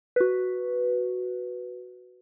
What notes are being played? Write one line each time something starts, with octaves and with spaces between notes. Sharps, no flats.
F#4 B4